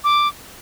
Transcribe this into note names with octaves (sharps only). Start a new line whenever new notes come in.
D6